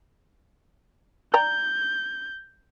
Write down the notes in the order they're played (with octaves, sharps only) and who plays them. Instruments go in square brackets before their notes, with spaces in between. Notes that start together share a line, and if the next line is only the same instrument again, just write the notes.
[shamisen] D5 G5 A#5 [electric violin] G6